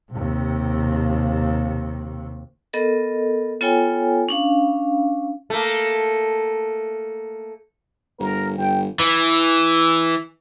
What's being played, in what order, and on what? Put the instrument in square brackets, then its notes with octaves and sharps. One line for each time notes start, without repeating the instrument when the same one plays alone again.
[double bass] D#2 C3
[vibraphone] B3 A4 A#4 D#5
B3 F4 A4 C#5 G5 G#5
C#4 D4 F5
[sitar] A3 A#3
[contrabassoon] G1 [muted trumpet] A#4
[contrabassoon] G1 [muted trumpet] G5
[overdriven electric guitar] E3